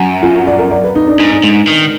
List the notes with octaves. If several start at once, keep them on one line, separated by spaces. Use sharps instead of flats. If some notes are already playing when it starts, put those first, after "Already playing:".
Already playing: F#2 F#4
F4
F#4
D5
A#4
D5
B4
D#4
D4
G#2 D#4
D4
G#2
D#3